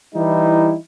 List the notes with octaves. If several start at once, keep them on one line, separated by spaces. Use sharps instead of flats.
E3 G3 D#4 E4